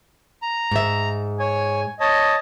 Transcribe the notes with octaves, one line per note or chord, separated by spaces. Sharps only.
A#5
G#2 E5
C#5 G#5
C#5 D#5 A5